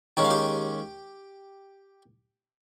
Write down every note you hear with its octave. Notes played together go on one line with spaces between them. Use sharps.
D#2 D#3 G#3 C#4 G5
F5
G4 G5